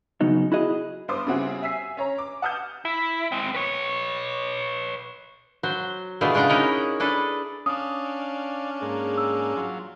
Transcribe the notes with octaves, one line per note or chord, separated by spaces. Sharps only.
C#3 F#3 B3 D#4
E4 F#4 G#4 D#5
G2 B3 C5 C6 D6 D#6
C#3 G3 C4 E4 F#4 G#4
E5 G#5 E6 B6 C7
C#4 C#5 A#5
D6
F#5 A5 D#6 F6 G6
E4
G#3 C4
B4 C#5
F#3 C5
B2 D3 A3 E4 F4 G#4
C#3 D4 F4 F#5 A#5
C#4 D#4 E4 A#4 C#5 D#5
D4 G#4 A4 B4
C#4 D4 D5 F5 D#6
G#2 A#3 G#4
E6
F#3 F4